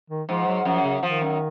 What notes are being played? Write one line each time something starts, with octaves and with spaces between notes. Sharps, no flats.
D#3
G#2 F3
F#3
F#2 F3
C#3
D#3 F3
F#2